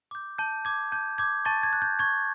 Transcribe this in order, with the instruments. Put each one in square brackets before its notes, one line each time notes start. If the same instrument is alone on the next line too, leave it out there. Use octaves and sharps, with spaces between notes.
[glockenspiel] D6 G6
A5 G6
D6 G6 G#6
A5 G6
D6 G6 G#6
A5 C#6 A6
G#6
F#6
G6
C#6 G#6